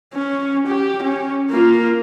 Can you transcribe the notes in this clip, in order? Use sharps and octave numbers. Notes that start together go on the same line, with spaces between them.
C#4
G4
C#4
A#3 F4